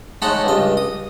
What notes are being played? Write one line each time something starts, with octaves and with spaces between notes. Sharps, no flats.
G#3 A3 D#4 A4 C#5 F#5
C#2 G2 D#5
D#6